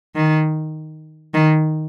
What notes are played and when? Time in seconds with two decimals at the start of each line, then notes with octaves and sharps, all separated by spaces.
0.15 D#3
1.34 D#3